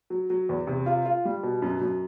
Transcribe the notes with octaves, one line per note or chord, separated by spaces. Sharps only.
F#3
F#3
E2
C3
F4
F4
G3
B2
F#2
F#2